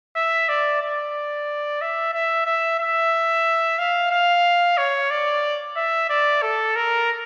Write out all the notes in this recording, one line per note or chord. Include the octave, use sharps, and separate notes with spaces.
E5
D5
D5
E5
E5
E5
E5
F5
F5
C#5
D5
E5
D5
A4
A#4